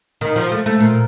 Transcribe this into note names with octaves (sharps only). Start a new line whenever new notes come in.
D#3
F3
A3
A3
A#2